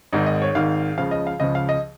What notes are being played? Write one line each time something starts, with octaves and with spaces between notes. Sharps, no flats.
G#1 G#2 D#3 D#4
D#5
C#5
G#1 G#2 D#3 F5
C#2 C#3 F3 F5
D#5
F5
C#2 C#3 F3 D#5
F5
D#5